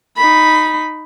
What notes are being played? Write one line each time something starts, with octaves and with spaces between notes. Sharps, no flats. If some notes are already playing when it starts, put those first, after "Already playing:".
D#4 B5